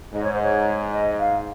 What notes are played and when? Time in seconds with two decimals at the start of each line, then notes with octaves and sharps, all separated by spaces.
0.14 G#2 D#5
0.23 C#5
0.33 C5
0.42 C#5
0.92 D#5
1.19 F5